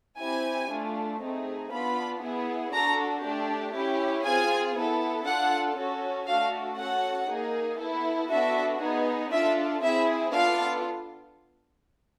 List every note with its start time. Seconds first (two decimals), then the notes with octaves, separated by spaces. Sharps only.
0.19 C4 E4 G4 G#5
0.70 A3 D4 F4
1.21 A3 C4 D#4 G#4
1.71 B3 D4 F4 B5
2.22 B3 E4 G#4
2.73 D4 F#4 A4 A#5
3.24 A3 D4 G4
3.74 C#4 E4 G4
4.25 C4 F4 G#4 G#5
4.75 B3 E4 A4
5.26 D4 F4 A4 F#5
5.77 C#4 F#4 A4
6.27 A3 D4 F#4 A4 F5
6.78 C#4 F#4 A4 F#5
7.29 A#3 D#4 G#4
7.79 B3 E4 A4
8.30 B3 D4 F#4 A4 E5
8.80 B3 D#4 G#4
9.31 D4 F4 A4 E5
9.82 C4 E4 G#4 E5
10.32 B3 D4 F4 A4 F5